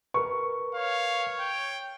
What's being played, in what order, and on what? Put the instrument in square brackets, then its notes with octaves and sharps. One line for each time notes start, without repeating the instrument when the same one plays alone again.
[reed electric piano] A#4 B4 [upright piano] C#6
[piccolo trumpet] C#5 [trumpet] F5
[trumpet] G5